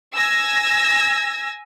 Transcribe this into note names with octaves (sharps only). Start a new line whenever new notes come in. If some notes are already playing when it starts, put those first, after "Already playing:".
G#5 E6 G#6 A#6